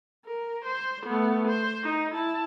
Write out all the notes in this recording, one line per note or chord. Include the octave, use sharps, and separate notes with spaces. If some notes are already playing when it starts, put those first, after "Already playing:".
A#4
C5
A3 B3
C5
D#4
E4 A5